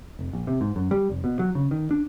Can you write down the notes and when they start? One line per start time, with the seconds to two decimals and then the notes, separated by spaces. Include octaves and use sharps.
0.19 F1
0.33 A#1
0.47 C3
0.61 G#2
0.76 F#2
0.91 G3
1.10 F1
1.24 B2
1.39 F#3
1.55 C#3
1.71 D#3
1.91 D4